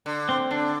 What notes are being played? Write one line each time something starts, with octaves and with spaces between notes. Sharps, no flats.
D3
C4
D3 D4